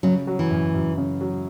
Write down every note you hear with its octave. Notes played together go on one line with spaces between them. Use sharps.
C#3 F#3
F#3
E3
F#2
F#2
C#3
F#3